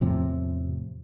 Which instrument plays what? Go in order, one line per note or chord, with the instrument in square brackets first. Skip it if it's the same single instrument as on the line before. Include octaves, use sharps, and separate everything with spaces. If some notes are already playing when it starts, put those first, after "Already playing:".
[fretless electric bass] E2 A2 C3 F3